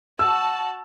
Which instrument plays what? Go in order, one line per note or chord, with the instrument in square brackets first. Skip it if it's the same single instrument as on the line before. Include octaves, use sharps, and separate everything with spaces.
[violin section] F#4 A5 [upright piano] E6